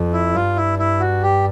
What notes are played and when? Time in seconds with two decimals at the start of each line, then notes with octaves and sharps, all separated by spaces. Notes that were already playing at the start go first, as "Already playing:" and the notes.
Already playing: F2
0.13 E4
0.35 G2 F4
0.56 E4
0.79 E4
1.00 F#4
1.22 G4